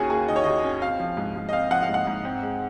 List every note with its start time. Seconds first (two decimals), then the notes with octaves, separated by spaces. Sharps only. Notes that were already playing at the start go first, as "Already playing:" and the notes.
Already playing: D#2 D#3 C#4 F#4 G#4
0.10 A#3 G#4
0.28 D#3 D#5
0.36 C#5
0.44 D#2 D#5
0.64 C#4
0.82 C4 F5
1.00 F3
1.17 G#2
1.36 G#2
1.49 D#5
1.53 C4 F5
1.71 F3 F#5
1.82 F5
1.89 G#2
1.94 F#5
2.07 G#2
2.25 C4
2.42 G#3